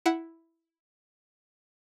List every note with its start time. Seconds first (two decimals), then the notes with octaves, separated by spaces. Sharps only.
0.06 E4 F#5